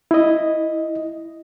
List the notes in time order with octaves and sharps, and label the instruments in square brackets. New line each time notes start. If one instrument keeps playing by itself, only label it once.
[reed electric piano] E4 D#5